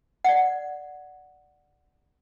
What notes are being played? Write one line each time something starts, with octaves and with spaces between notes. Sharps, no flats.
D5 F#5